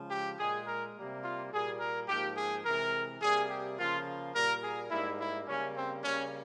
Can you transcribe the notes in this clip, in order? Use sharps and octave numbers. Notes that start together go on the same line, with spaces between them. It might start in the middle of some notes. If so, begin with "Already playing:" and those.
Already playing: C#3 F3 G#3
G4
A#2 G#3 G#4
A#4
C3 G3 A#3
F4
A#2 G3 A#3 G#4
A#4
G#2 F3 A#3 G4
G#4
C3 E3 G#3 A#4
C3 G3 A#3 G#4
G4
C#3 F3 A#3 F4
A#2 G3 A#3 A#4
G#4
G#2 G3 A#3 E4
E4
C#3 G3 A#3 C#4
C4
C#3 G3 A#3 C#4